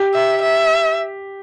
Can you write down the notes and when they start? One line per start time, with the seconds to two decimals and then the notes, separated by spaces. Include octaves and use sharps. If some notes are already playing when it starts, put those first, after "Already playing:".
Already playing: G4
0.15 E5
0.42 E5